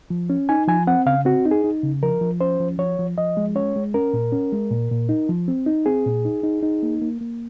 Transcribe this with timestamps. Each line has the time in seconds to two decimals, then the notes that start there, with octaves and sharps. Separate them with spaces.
0.10 F3
0.30 C#4
0.49 D#4 G#5
0.68 F3 G#5
0.87 C4 F#5
1.06 C#3 F5
1.25 C4 F#4
1.45 D#4
1.51 G#4
1.64 D#4
1.83 C#3
2.03 F3 A#4
2.21 F3
2.41 C#4 C5
2.60 F3
2.79 F3 C#5
2.99 F3
3.18 F3 D#5
3.37 G#3
3.55 C#4 C#5
3.76 G#3
3.94 C#4 A#4
4.13 A#2
4.32 C#4
4.53 G#3
4.71 A#2
4.91 A#2
5.09 D#4
5.29 F3
5.48 C4
5.67 D#4
5.86 C4 G#4
6.06 A#2
6.25 D#4
6.43 D#4
6.63 D#4
6.83 A#3
7.02 A#3
7.21 A#3